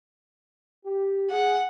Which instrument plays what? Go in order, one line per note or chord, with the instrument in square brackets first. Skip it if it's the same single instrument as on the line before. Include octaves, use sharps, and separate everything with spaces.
[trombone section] G4
[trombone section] G#4 [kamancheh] F#5